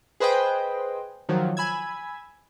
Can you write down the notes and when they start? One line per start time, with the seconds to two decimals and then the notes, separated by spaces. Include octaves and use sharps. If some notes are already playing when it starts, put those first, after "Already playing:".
0.20 G#4 B4 C5 D#5 G5
1.29 D#3 F3 F#3
1.57 G#5 B5 E6 G#6